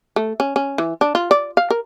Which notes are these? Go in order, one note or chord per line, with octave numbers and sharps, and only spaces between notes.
A3
C#4
C#4
E3
D4
F4
D5
F5
A#4